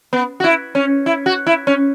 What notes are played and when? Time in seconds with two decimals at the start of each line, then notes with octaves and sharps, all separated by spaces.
0.13 B3
0.40 F#4
0.44 E4
0.75 C#4
1.06 E4
1.26 F#4
1.47 E4
1.67 C#4